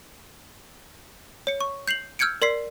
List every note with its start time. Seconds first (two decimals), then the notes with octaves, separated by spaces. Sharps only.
1.47 C#5 C#7
1.61 C#6
1.88 G6 C7 F7 F#7
2.19 E6 F6 G6 G#6 C#7 D7
2.42 A#4 D5 C6 B6 C7